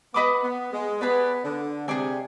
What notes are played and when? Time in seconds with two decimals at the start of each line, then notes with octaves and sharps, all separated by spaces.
0.14 B3 B4 D#5 B5 D6
0.44 B3
0.73 G#3
1.01 B3 G#4 B4 D5
1.44 D3
1.88 C3 G#4 D5 G#5